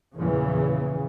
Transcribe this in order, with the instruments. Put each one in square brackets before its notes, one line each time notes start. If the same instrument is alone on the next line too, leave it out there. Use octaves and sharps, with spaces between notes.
[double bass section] E2 E3 [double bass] A#2 C#3